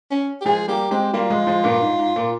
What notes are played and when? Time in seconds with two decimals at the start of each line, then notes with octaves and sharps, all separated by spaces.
0.11 C#4
0.41 G4
0.45 F3 G#3 G#4
0.68 G3 A#3 G4
0.91 G#3 C4 G4
1.13 G3 A#3 F4
1.30 F3 G#3
1.47 F3 G#3
1.64 G2 A#2
1.82 G#2
1.99 G#2
2.16 A#2